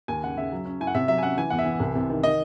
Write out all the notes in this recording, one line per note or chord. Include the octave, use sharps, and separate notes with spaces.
D#2 G#5
C#3 F#5
C#3 E5
F#3
C#4
E4 G#5
F#5
C3 E5
F#3 E5
G#5
C#4 F#5
E3 G#5
E2 F#5
E5
E3
C2
C3
D#3
D#3 D#5